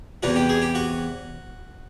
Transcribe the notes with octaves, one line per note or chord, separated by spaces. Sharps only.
E2 C3 E3 F#4
G4
G#4
G4
F#4